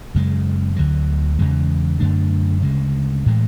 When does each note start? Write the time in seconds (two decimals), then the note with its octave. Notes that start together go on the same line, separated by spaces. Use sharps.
0.15 F#2 C#3 G#3
0.76 D2 D3 F#3
1.39 E2 C#3 E3 G#3
2.00 F#2 D3 A3 D4
2.62 D2 C#3 G#3
3.26 A2 E3 G#3